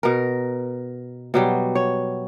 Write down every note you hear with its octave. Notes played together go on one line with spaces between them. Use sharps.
B2 A#4
B2 F#3 G3
C#5